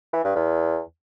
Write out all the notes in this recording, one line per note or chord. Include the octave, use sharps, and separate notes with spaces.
E3
G2
E2